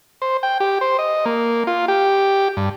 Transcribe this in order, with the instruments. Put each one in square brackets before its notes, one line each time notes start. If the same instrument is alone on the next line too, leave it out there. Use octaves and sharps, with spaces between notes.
[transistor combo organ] C5
G5
G4
C5
D#5
A#3
F4
G4
G2